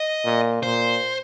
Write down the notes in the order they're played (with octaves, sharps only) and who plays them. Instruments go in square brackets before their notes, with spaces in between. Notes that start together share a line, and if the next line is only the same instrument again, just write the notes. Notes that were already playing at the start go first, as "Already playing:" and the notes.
Already playing: [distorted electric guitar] D#5
[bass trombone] A#2
[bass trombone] A#2 [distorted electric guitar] C5